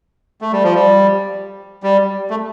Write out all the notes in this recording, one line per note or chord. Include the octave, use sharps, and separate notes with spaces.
A3
G3
F3
G3
G3
A3